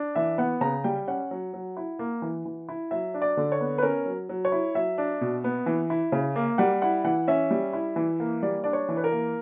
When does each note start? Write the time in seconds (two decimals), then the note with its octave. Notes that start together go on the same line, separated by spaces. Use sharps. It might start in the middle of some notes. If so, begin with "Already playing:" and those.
Already playing: D4
0.15 E3 E5
0.38 B3 F#5
0.61 C#3 A#5
0.84 G3 G5
1.08 C#4 F#5
1.31 F#3
1.54 F#3
1.77 E4
1.99 A#3
2.22 E3
2.45 E3
2.69 E4
2.91 F#3 E5
3.14 D4
3.22 D5
3.37 D3
3.52 C#5
3.61 B3
3.78 B4
3.82 C#4 A#4
4.06 F#3
4.29 F#3
4.45 C#5
4.52 E4
4.75 F#3 E5
4.98 D4
5.21 B2
5.44 B3
5.66 E3
5.90 E4
6.12 C#3
6.36 A#3
6.58 G3 F#5
6.82 E4 F#5
7.04 E3 F#5
7.28 C#4 E5
7.51 G3
7.73 E4
7.96 E3
8.20 A#3
8.43 G3 D5
8.64 D4 D5
8.73 C#5
8.89 E3
8.97 B4
9.04 A#4
9.12 A#3